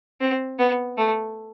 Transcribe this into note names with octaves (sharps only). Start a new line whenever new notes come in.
C4
B3
A3